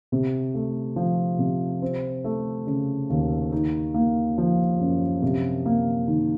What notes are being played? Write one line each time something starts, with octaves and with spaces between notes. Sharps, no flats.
C3
A3
F3
C3
C4
A3
C#3
D#2
D#4
A#3
F3
F#2
C3
A#3
D#3